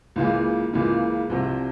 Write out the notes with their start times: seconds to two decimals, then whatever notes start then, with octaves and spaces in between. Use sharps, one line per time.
0.16 C#2 C#3 E3 A#3 F4
0.73 C#2 C#3 E3 A#3 F4
1.30 C2 C3 F3